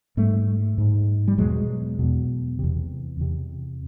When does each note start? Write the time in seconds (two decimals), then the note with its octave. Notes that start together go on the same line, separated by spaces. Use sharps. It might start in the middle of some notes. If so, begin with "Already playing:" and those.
0.17 G#2 G3 A3
0.78 G#2
1.28 G3
1.38 E2 B2 F#3 G#3
1.99 E2 B2
2.59 E2 C3
3.20 E2 C3